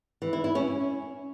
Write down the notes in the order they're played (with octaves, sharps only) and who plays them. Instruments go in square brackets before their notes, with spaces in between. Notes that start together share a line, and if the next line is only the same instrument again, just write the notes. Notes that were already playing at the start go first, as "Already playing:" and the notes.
[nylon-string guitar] E3
E4
E4
C#4